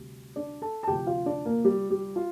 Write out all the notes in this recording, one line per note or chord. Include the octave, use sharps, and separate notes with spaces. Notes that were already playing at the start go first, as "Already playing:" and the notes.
Already playing: D2 C3 G3
D4 D5
A4 A5
A5
D2 C3 F3 G4 G5
F4 F5
D4 D5
A#3 A#4
G3 G4
G3 G4
F4